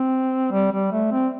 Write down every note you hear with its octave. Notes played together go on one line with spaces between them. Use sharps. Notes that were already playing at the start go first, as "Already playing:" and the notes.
Already playing: C4
G3
G3
A3
C4